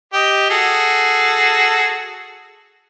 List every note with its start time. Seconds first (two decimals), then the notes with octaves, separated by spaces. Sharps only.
0.14 G4 D#5
0.50 F#4 G#4 A4